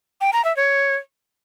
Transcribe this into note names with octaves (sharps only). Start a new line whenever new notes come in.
G5
A#5
E5
C#5